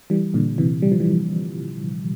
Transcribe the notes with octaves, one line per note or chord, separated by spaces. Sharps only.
E3 G3
A#2 D3
C3 E3
G3
F3
E3 G3